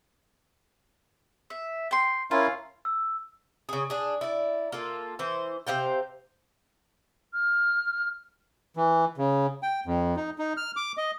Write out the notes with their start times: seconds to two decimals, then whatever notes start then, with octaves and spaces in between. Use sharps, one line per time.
1.50 E5
1.91 G5 C6
2.31 C#4 E4 F4 A#4
2.85 E6
3.69 C#3 G#4
3.90 D4 G#4
4.21 E4 D5
4.72 A#3 F4 A4
5.19 E3 C5
5.67 C3 C5 F5 G5
7.33 F6
8.76 E3
9.18 C#3
9.63 G5
9.86 F2
10.17 D#4
10.39 D#4
10.57 F6
10.76 D6
10.97 D#5